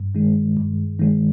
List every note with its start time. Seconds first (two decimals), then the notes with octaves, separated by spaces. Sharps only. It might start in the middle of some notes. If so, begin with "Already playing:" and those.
Already playing: G2
0.15 D#3 G#3
0.57 G2
0.99 D#3 G#3